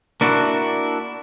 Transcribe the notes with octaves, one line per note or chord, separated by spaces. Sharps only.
A#3 D4 E4 F#4